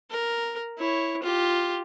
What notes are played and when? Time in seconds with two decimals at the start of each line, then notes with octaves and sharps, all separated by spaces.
0.10 A#4
0.78 E4 C#5
1.23 F4 G4